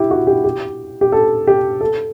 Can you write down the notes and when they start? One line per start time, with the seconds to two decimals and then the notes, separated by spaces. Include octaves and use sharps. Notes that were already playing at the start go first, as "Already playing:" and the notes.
Already playing: E4 G4
0.11 F#4
0.27 G4
0.44 G4
1.01 G4
1.12 A4
1.47 G4
1.81 A4